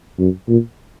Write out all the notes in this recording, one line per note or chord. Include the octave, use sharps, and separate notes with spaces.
F#2
A#2